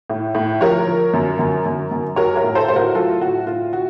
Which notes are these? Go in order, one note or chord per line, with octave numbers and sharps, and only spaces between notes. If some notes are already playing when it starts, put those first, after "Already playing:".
A2
A2
F3 A#4 C#5
F3
F#2
F#2
F#2
F#2
F#3 A#4 C#5
A#4 C#5
A2
A4 C5
A2 C5
F#4 A#4
F#3 F4 A4
A2 F#4
A2 F4
F#4